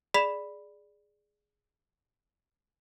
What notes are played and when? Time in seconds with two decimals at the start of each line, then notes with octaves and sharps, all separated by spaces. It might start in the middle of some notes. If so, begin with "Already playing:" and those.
0.14 G#4 D5 B5 B6 E7 F7